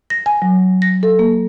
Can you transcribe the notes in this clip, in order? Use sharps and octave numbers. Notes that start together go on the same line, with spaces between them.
A#6
G#5
F#3
A#6
A4
A#3